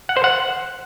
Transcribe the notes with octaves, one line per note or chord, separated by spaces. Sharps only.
F#5
C5
F#5